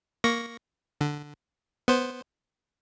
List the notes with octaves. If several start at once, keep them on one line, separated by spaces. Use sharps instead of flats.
A#3 C#6 A#6
D3
B3 C5